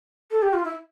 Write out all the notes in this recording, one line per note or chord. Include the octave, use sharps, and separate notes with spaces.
A4
G4
F4
E4